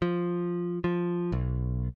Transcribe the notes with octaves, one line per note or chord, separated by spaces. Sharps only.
F3
F3
B1